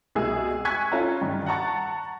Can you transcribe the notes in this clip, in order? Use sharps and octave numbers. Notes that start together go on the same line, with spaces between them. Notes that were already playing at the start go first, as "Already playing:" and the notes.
C2 B2 G#3 G#4 E6
G#5 C#6 F#6 G#6 B6
C#4 F4 A4 A#5
G2 D#3
F#5 A5 A#5 C#6 A6